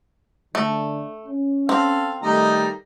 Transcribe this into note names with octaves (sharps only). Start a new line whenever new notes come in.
D3 A3
C#4
C4 A4 F5
D#3 G3 A3 D#4 A#5